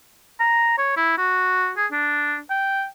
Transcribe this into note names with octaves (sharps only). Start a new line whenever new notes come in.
A#5
C#5
E4
F#4
G#4
D4
G5